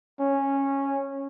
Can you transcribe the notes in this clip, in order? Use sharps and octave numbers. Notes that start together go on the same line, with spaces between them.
C#4